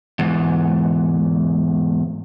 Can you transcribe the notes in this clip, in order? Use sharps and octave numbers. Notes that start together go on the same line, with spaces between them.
E2 G#2